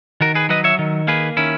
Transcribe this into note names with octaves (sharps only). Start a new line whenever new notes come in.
D#3 F#4 A#4
G#4 B4
F#3 B4 D#5
C#5 E5
D#3
A#3 G#4 B4
D#3 C#4 E4